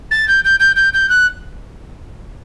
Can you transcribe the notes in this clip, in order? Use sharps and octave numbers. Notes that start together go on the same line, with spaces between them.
A6
G6
G6
G6
G6
G6
F#6